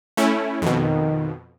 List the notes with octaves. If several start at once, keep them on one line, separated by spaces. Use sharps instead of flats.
A3 C#4 E4
F2 B2 D#3